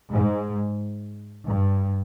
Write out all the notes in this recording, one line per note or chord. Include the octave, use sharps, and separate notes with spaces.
G#2
G2